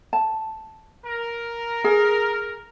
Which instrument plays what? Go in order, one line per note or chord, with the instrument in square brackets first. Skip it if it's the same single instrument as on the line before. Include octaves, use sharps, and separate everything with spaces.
[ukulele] A5
[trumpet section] A#4
[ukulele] G#4